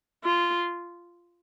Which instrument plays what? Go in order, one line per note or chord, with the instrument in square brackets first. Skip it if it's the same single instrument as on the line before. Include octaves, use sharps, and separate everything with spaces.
[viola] F4